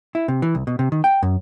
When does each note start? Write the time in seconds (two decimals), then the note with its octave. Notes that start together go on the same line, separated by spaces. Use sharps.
0.15 E4
0.28 C3
0.42 E3
0.55 C2
0.67 B2
0.79 C3
0.92 D#3
1.04 G5
1.22 F#2